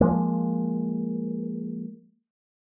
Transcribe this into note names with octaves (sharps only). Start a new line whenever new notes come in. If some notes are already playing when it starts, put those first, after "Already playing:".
F3 G#3 A#3